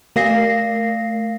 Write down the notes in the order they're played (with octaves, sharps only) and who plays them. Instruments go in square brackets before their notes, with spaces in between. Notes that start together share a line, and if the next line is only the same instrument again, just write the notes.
[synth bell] A3 A#4 F5 A#6 C7